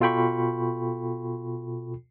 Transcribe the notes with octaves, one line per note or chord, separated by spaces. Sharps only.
B2 F4 A4 G5 B5 C#6